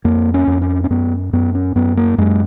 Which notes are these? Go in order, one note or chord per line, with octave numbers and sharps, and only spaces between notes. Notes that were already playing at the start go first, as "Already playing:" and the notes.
F2 A#3
C#4
F2
C#4
C#4
F#2 B3
F#2 B3
C#4
F#2 B3
A#3
F#2 G#3